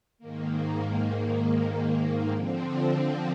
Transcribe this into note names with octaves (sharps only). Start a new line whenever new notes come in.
G#2 D#3 A#3
D3 F3 C4